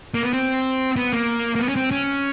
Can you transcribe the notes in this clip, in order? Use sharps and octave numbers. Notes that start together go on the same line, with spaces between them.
A#3
B3
C4
B3
A#3
A#3
B3
C#4
C4
C#4